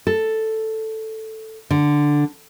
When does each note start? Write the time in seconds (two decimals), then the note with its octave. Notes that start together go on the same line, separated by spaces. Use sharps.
0.07 A4
1.70 D3